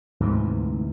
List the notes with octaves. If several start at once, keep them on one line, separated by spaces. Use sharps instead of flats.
D2 G#2 C3 E3